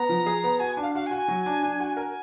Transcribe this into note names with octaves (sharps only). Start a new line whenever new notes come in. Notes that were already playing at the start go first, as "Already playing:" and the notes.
Already playing: B3 A#5
F3
G#4
B3
F#4 G#5
D4
F5
F#4 F5
G#5
F#4
G#5
F#3
D4
D4
F#4
A#4 G#5